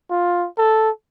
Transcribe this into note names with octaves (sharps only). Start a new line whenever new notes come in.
F4
A4